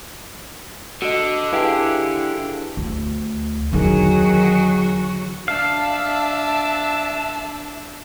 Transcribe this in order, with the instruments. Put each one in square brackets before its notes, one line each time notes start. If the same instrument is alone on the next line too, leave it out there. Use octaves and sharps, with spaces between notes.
[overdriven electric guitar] D3 [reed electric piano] F#4 D#5
[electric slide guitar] E4 G4 G#4 [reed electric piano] B4 F5 A5
[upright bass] D2
[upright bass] E2 D3 [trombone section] D#3 G#4 [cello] F#3 F#4
[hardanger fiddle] D4 [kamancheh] E5 A5 [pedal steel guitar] F5